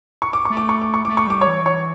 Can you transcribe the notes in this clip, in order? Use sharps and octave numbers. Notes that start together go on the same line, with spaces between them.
C#6
D6
A3 C#6
D6
C#6
D6
C#6
A3 D6
C#6
G3 D6
C#5 C#6
E3
C#5 C#6